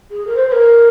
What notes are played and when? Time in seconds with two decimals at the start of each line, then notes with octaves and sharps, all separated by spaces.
0.10 G#4
0.26 A#4
0.36 C5
0.47 C5
0.52 A#4